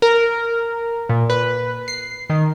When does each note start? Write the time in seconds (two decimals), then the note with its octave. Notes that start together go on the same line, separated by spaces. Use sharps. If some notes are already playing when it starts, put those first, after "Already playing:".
0.02 A#4
1.09 A#2
1.30 B4
1.88 C7
2.30 D#3